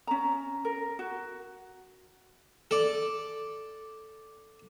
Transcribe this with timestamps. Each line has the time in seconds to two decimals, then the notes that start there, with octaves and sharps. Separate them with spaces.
0.07 C#4 A#5
0.65 A#4
0.99 F#4
2.71 A4 D5